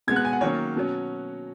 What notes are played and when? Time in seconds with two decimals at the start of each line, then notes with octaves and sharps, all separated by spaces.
0.07 B2 G#3 B3 G#6
0.16 F#6
0.25 G#5
0.33 F#5
0.41 D#3 F#3 A#3 C#4 C#5
0.76 B2 F#3 C#4